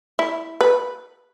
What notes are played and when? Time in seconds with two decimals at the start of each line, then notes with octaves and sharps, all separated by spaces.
0.19 E4
0.61 B4